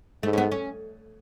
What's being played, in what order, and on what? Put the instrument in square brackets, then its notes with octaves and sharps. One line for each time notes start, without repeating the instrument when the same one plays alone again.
[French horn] G#2 [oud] A3
[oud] C#4
B3
C#4